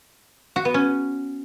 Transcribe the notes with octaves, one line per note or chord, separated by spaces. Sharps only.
F#4
B3
C#4